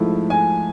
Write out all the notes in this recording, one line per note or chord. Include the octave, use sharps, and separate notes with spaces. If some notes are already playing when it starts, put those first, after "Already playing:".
Already playing: G#2 F3 A3 E4
G#5